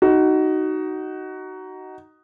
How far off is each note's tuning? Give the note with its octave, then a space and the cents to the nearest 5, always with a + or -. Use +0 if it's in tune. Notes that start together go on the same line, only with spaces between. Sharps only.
D#4 +0 F#4 +20